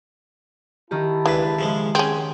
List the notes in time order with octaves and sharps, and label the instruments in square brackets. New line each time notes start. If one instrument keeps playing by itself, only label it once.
[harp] D#3 G4 [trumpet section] E4 A5
[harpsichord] C#2 D4 B4 [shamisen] E3
[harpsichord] C#3 F3 G#3
[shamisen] C4 C#4 [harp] G#4 [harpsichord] F#5